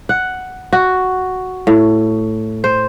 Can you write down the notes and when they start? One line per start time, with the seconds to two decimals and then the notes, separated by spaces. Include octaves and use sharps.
0.09 F#5
0.73 F#4
1.67 A2
2.64 C5